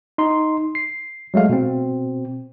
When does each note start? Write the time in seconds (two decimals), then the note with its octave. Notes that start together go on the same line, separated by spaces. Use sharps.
0.18 D#4 C6
0.75 C7
1.34 F#3 G#3 A3 F5
1.49 B2 C4